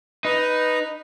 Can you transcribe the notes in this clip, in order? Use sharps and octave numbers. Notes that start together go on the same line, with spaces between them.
D#4 B4